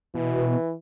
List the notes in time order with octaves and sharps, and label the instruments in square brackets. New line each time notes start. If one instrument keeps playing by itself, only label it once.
[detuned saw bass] B2 [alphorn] E3